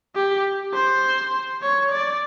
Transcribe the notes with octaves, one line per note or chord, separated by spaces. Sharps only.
G4
C5
C#5
D5